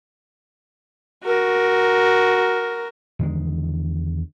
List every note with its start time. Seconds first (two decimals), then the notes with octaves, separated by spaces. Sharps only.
1.24 F#4 A#4
3.19 E2 D3 D#3 G#3